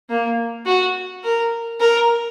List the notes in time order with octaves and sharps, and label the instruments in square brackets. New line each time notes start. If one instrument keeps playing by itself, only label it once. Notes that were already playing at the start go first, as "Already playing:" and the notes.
[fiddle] A#3
F#4
A#4
A#4